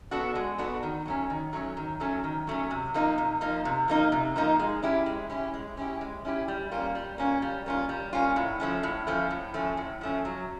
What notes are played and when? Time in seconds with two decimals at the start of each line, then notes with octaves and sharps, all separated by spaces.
0.11 B3 D4 F#4 A4
0.35 G#3
0.58 B3 D4 F#4 A4
0.83 D#3
1.05 F#3 A3 C#4
1.30 D#3
1.53 F#3 A3 C#4
1.77 D#3
2.00 F#3 A3 C#4
2.24 D#3
2.47 F#3 A3 C#4
2.71 C3
2.94 F3 A#3 D#4
3.18 C3
3.41 F3 A#3 D#4
3.65 C3
3.88 F3 A#3 D#4
4.12 C3
4.36 F3 A#3 D#4
4.59 G#3
4.83 C#4 E4 G4
5.06 G#3
5.30 C#4 E4 G4
5.54 G#3
5.77 C#4 E4 G4
6.01 G#3
6.25 C#4 E4 G4
6.48 G3
6.71 A#3 C#4 F4
6.95 G3
7.18 A#3 C#4 F4
7.42 G3
7.66 A#3 C#4 F4
7.89 G3
8.13 A#3 C#4 F4
8.36 A2
8.60 F3 A3 C#4
8.83 A2
9.07 F3 A3 C#4
9.30 A2
9.54 F3 A3 C#4
9.77 A2
10.01 F3 A3 C#4
10.25 F#3